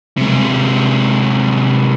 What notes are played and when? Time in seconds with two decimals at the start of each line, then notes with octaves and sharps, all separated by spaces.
0.17 C3 G#3